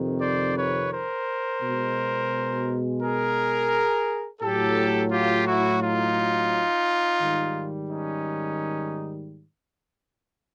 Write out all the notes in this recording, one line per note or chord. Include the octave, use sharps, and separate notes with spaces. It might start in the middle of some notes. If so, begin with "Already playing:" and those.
Already playing: F2 C3 D#3
C5 D5
B4 C#5
A#4 C5
B2 G#3
G#4 A#4
A2 F#3 G4 A4
F4 G4
E4 F#4
D#4 F4
G#2 D#3 G3
C#4 D#4